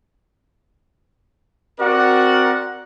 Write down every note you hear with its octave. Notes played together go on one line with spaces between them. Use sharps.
C4 F#4 A#4 D5 F#5